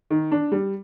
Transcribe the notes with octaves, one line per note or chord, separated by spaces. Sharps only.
D#3
D4
G3